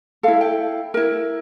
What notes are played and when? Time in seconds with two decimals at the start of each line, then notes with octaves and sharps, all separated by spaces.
0.23 E4 A4 F5
0.41 G5
0.94 E4 A#4